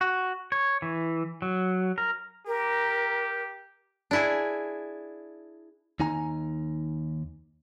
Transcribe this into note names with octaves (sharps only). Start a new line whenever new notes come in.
F#4
C#5
E3
F#3
A#4
G4 A#4
D4 E4 G#4
D#2 D#4 G#5 A#5